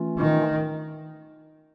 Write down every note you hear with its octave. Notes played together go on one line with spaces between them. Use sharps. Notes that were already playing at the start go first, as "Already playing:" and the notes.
Already playing: E3 A3 C#4 F4
D#3